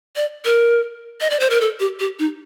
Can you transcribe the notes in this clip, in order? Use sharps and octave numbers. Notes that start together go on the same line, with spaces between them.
D5
A#4
D#5
D5
C5
A#4
A4
G4
G4
D#4